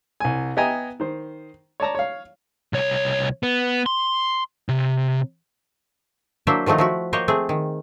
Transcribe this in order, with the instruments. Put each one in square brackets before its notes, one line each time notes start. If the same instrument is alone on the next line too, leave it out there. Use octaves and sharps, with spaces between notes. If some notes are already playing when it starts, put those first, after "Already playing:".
[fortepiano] C2 G#5
B3 D#5 E5 G5 G#5 A#5
D#3 C5
C#5 D5 A5 A#5
C#5 F5
[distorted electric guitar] C2 C#5
B3
C6
C3
[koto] F#3 A#3 D4 E4 C5 E5
D#3 F3 F#3 A3 D#4
F3 E4 F#4
A#3 C5 C#5 D#5 G5
A3 C4 G#4
D#3